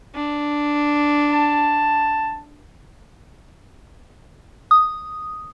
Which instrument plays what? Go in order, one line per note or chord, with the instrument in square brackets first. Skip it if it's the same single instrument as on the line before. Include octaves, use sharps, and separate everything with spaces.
[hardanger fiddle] D4
[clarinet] A5
[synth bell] D#6